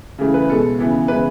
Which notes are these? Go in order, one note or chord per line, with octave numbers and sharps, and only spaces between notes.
C#3 E3 A3
B4
B2 G#3 B3 A4
C#3 E3 B3
C#3 E3 G#3 B3 B4